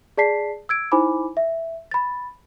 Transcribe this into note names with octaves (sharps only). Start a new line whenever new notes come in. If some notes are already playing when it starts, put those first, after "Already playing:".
G#4 D5 A5 B6 C7
E6 G#6 D7
D#4 E4 C5 G#5 B5 D6
E5
B5 A6